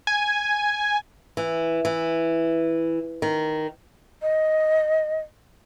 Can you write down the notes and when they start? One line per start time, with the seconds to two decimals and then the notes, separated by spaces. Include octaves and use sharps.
0.07 G#5
1.37 E3
1.85 E3
3.22 D#3
4.22 D#5